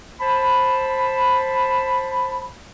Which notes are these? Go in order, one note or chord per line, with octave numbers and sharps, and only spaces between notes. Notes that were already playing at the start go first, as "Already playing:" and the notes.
C5 A5 B5